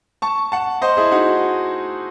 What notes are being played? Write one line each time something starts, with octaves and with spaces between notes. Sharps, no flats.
A5 C#6
F#5 A5
C5 D#5
E4 G#4
D#4 F#4